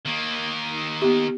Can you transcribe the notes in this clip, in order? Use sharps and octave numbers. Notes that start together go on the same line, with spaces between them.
D#3 A#3
B3 G4